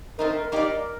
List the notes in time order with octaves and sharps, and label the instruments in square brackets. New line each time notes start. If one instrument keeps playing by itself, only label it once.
[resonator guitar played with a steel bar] A3 C4 D#4 [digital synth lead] A#4
[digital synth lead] A#4
[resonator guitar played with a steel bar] A#3 D#4 G4 D5 [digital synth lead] A#4